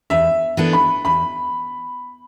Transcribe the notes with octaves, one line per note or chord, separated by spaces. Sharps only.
E2 E5
E3 B3 D4 A4
B5
E2 B5